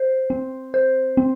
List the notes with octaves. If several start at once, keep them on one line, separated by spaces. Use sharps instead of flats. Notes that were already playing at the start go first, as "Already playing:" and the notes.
Already playing: C5
C4
C5
C4